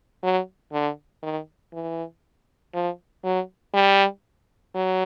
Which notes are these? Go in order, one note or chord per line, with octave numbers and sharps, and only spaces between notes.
F#3
D3
D#3
E3
F3
F#3
G3
F#3